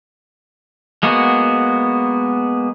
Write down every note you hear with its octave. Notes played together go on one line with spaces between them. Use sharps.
G#3 A#3 B3 F#4